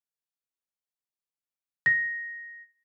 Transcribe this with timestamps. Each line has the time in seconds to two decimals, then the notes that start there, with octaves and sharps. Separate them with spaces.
1.86 A#6